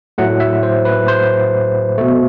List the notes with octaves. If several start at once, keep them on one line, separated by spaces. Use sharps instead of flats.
A2 F#3 A3 F#5
E5
C5
B4
C5
B2 A3